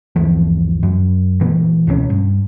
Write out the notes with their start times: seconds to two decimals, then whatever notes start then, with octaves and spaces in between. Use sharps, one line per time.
0.16 G1 D#2 E3 F3
0.83 F#2
1.41 A#2 D#3 E3
1.87 C#2 B2 A3 C#4
2.10 G2